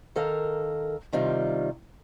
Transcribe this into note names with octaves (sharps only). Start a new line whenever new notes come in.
D#3 A4 A#4 F5
C3 D#3 G3 F4